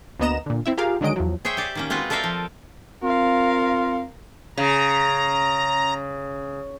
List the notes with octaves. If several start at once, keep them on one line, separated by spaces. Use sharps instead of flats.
D2 A#3 B3 D#5 A#5 E7
A#2 D3
C4 E4 E5
F4 G4 G#4 A#4 F5
D3 D#3 F#3 G#3 D#5 D7
E2 F3 F#3
G#4 C5 C#5 E5 G5
G4 D5
D#3 A#3 C#4
G#3 C4 F4 F#4 B4
A4 A#4 D5 E5 F5 G5
F3
C4 F4 A#4 F5
C#3 A#5